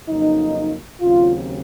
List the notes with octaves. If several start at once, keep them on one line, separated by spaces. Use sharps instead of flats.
F2 C#3 F#3 A#3 D#4
D#2 C#3 F#3 C4 F4